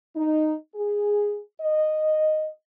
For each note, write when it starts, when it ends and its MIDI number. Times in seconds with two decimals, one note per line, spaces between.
0.15 0.53 63
0.75 1.39 68
1.61 2.49 75